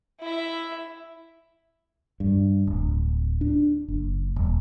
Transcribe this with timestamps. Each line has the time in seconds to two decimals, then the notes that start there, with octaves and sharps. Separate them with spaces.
0.21 E4 E5
2.20 G2
2.67 D1
3.41 D4
3.88 F#1
4.36 D#1